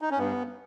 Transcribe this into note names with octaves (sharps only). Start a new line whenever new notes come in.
D#4
C#4
G2 B3